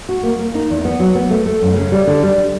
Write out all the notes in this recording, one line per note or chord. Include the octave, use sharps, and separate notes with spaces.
F#4
A#3
A#3
D#4
E2
B3
F#3
B3
A3
A3
F#2
C#3
G3
D3
G3